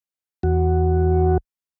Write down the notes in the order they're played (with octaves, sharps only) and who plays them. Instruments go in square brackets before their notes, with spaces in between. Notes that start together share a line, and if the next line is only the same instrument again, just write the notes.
[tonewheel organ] E2 F#4